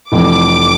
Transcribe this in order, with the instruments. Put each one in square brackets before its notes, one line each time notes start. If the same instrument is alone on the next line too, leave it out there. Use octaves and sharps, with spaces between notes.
[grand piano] F1 F2 E3 [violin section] D6